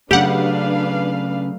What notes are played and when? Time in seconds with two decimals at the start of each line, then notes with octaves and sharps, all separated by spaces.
0.11 C#3 F#3 A3 D4 G4 B4 F5 F#5